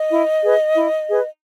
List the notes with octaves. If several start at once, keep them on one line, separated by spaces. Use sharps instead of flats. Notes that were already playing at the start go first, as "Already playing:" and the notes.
Already playing: D#5
E4
G#4 B4
E4
G#4 B4